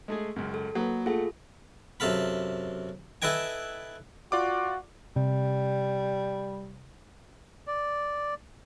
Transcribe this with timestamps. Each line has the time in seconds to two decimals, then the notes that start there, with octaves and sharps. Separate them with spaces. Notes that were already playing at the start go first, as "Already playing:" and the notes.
0.08 G#3 A3 G#4
0.36 C#2 F#2
0.54 A4
0.75 F#3 A#3 B4
1.06 A3 F4 G#4 A4 F#5
2.00 F#2 C3 A4 F5 B5
3.22 E4 A4 B4 D#5 G5 G#5
4.32 F4 F#4 D5 D6
5.16 C3 G3
7.67 D5